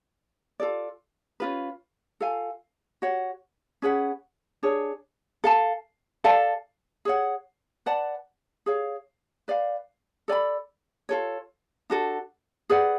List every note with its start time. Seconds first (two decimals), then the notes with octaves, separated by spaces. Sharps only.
0.60 F4 A4 D5
1.40 C#4 F4 B4
2.20 F4 A4 F5 G#5
3.02 F#4 C#5 F#5
3.82 C#4 G#4 B4 F#5
4.63 D4 G#4 C#5
5.44 A4 F5 A5
6.24 A4 D5 F5 A5
7.05 G#4 C#5 F#5
7.86 B4 D5 F#5 A5
8.66 G#4 C#5 F5
9.48 B4 D5 F5
10.28 A4 D5 G#5 B5
11.09 F4 A4 C#5
11.90 D4 F#4 A4
12.69 G#4 B4 D5 F#5